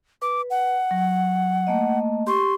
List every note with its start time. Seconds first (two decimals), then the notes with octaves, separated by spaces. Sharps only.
0.22 B4 D6
0.50 F#5
0.91 F#3
1.67 A3 A#3 D#5
2.27 G4 C6 C#6